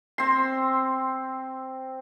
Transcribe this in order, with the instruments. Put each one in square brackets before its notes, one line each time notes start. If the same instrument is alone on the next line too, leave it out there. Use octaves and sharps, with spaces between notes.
[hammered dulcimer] C4 C6